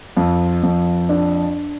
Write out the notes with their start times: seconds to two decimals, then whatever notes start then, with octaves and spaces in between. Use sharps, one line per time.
0.17 F2
0.63 F2
1.09 D4